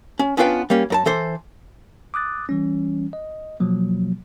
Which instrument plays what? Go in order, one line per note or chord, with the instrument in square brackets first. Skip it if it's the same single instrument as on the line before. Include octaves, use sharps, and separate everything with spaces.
[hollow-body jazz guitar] C#4
B3 C#4 D4 F4 B4 G5
G3 A#3 C#4
F#2 A#4 A5
E3 A4 C5
[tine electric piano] D6 D#6 F#6 A6
E3 G3 C#4
D#5
B2 F3 F#3 A#3